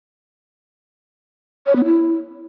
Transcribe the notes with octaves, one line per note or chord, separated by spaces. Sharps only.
C#5
B3
E4